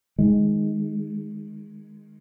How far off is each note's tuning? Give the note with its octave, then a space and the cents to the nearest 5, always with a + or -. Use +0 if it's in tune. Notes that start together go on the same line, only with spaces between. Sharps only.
D#3 +0 G#3 +0